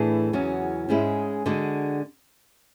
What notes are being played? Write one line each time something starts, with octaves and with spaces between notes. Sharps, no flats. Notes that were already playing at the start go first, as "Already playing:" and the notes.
Already playing: A2 E3 A3 D4 G#4
E2 C#3 F#3 C#4 F#4
G#2 G#3 C#4 E4 G#4
D3 G#3 D4 F#4